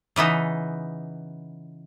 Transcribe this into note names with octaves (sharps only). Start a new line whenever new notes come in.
C#3 E3 B3 D#4